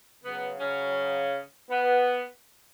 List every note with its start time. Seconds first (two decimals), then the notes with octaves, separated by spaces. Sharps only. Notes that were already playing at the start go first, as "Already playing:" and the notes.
0.23 C#3 F#3 B3
0.60 C#3 C#4
1.70 B3